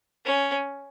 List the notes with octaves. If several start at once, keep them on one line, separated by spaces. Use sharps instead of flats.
C#4